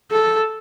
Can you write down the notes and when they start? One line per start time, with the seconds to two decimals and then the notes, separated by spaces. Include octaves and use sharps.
0.11 A4